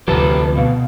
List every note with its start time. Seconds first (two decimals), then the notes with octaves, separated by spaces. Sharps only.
0.08 D2 C3 F3 G4 A4 B4 A5
0.57 B2 F5